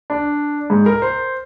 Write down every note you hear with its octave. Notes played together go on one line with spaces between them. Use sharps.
D4
G#2
A#4
C5